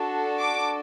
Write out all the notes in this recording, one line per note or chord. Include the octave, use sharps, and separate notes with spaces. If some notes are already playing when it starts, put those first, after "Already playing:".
Already playing: D4 F#4 A4
D6